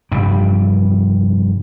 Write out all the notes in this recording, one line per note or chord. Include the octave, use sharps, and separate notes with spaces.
F1 G2 G3